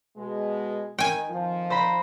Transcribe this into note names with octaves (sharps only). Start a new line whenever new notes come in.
B2 G#3
D#3 G5 G#5
F2 D#3 F3
C5 A#5 B5